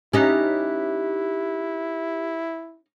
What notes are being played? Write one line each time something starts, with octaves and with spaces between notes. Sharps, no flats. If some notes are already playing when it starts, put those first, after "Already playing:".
C#4 D#4 E4 G4 E5 F#6